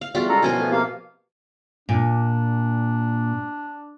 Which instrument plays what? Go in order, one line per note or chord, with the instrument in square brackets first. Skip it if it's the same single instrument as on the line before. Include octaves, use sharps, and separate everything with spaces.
[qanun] F5
[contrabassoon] E2 [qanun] G3 F4 F#4
[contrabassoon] C#2 [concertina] A4 A#5
[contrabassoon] F#2 [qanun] B2 F3 A#4 [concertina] G#5
[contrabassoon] A2
[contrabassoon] C3 [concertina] A#3 F5
[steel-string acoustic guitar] A#2 [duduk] D4